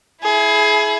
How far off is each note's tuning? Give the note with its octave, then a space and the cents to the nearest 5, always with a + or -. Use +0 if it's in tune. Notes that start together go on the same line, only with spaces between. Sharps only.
E4 +0 G#4 +25